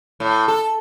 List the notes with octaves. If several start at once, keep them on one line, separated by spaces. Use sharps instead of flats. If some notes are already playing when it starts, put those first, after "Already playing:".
A2
A4